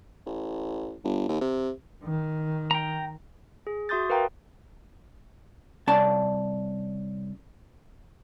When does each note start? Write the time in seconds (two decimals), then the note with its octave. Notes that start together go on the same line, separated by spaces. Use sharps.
0.26 A1
1.04 G1
1.29 D#2
1.41 C3
2.04 D#3
2.71 G5 A#5
3.67 G#4
3.89 F#4 E5 C6 D#6 G6 A6
4.10 A#4 B4 F5 G5 A#5
5.87 C2 C#4 D5 A5